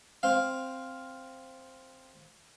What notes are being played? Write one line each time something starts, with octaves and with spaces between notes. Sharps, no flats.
C4 F5